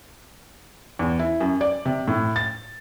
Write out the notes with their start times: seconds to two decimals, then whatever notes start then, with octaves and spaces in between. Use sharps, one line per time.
0.99 E2
1.19 E4
1.41 F#2
1.61 D5
1.85 C3
2.08 A2
2.36 A6